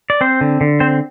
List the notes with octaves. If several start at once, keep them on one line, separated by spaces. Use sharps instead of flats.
D5
C4 C5
D3
D3
C4 C5